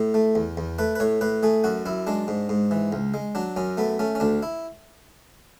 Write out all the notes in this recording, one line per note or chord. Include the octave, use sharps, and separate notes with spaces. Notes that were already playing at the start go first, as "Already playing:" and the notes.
Already playing: A2
A3
E2
E2
A3 B4
B4
A2 C#5
A2 B4
A3 G#4
F#2 F#4
F#2 E4
G#3 D4
G#2
G#2
E3
C#2
G#3
F#3 D4
F#2 C#4
A3 B3
A3 C#4
C#4
D2 D4
E4